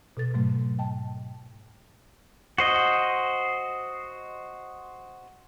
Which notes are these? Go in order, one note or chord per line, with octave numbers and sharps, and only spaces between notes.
B2 A4 A6
G#2 B2 F#3 A3
D#5 G5 A5
F#4 C5 D#5